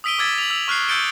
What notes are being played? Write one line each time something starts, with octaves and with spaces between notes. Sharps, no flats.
D#6 E6 B6 D7 D#7 G7
D6 E6 G#6 A6 B6
F7 F#7
E6 F7
C#6 F6 F#6 C7
E6 G6 A6 C#7 D7 G7